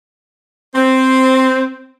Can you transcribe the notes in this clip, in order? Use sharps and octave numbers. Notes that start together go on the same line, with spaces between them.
C4